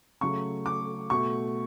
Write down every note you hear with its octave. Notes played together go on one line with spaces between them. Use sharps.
C#3 F#3 A3 C#6
D6
B2 A3 C#6